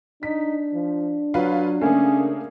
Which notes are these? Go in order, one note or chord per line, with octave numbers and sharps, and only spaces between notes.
D4 D#4 B6
F3
F#3 F4 B4
C#3 A3 A#3 C#4 G#4